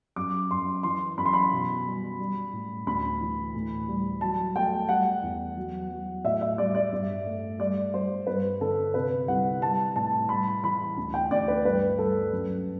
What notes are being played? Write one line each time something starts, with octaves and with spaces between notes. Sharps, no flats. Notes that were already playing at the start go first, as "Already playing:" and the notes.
F#2 D6
F#2 C6
E3 C6
F#2 B5
C6
B5
B2
G3
G3
A2
D2 B5
E3
A2
G3
F#3 A5
A3 G5
G3 F#5
E2
F#3
F#3
A2 E5
E5
G3 D5
D5
G2
A3
G3 D5
G3 C5
G2 B4
D3 A4
C3 B4
C2 F#5
G3 A5
A2 A5
G3 B5
E3 B5
D2
G5
D2 D5
B4
G2 B4
G2 A4
F#2